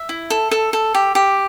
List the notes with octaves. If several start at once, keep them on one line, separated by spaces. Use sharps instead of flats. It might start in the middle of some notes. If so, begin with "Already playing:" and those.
Already playing: E5
E4
A4
A4
A4
G4
G4